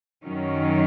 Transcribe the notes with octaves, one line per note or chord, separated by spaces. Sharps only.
F#2 D#3 F#3 C#4